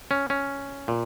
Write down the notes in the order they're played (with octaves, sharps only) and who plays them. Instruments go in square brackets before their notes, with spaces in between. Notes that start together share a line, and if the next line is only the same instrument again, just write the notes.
[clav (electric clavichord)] C#4
C#4
A#2